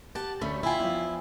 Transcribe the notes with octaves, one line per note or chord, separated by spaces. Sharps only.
G4 F#5 A5
D2 A3 C#4 B5
E4 F4 G5 G#5 B5
E2 F3